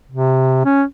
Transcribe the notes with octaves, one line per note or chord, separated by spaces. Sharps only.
C3
C#4